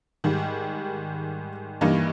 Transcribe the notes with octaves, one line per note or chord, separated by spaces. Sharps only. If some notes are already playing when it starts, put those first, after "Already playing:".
G#2 D#3 G3
G2 E3 G3 A#3 D#4